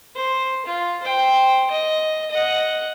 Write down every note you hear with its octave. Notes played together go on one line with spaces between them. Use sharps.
C5
F4
C5 G5
D#5
D#5 F#5